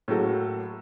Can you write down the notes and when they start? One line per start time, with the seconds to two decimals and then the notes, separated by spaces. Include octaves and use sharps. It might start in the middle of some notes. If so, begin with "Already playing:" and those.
0.08 A2 F#3 A#3 F#4 A4